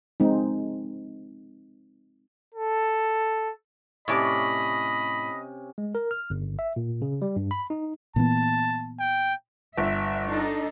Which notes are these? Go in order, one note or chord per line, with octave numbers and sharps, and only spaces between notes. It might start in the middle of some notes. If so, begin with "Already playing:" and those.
G#3 C4 D#4
A4
A2 C3 C#4 D5 D#5 B5 C#6
G#3
A#4
F6
G1
E5
A#2
C#3
G3
G2
B5
D#4
A#2 E3 B3 A5
G5
G1 E5
D4 D#4 A4